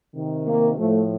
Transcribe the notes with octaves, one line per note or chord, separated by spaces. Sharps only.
C3 D#3
A#3
A2 F3 A3